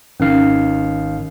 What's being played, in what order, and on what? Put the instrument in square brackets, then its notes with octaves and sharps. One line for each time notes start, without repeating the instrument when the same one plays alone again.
[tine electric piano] G#1 D#3 F5 [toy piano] C#4